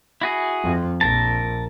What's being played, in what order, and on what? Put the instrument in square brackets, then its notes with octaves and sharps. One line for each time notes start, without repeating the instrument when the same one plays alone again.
[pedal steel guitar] E4 F#4 G#4
[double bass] F2
[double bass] A#1 [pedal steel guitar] A#4 A5